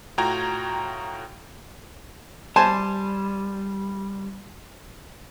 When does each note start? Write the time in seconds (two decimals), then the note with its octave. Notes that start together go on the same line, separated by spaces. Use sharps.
0.18 A2 F4 F#4 G5 A#5 G#6
2.56 G3 C5 G#5 A5